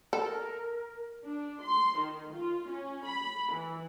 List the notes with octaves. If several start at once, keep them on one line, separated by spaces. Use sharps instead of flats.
A4 A#4
D4
C6
D#3
F4
C#4
B5
E3